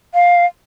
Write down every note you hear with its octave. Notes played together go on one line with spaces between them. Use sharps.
F5